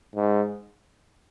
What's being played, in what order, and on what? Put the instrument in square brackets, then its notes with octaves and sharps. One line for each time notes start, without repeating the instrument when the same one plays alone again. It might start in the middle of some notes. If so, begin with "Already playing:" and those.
[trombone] G#2